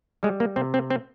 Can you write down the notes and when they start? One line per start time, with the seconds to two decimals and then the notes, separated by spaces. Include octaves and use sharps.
0.23 G3 G#3
0.40 A#3
0.56 C3 C4
0.74 C4
0.90 C4